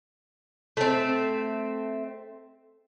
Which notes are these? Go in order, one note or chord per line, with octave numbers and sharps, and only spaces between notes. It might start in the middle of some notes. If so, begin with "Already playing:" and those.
A3 C4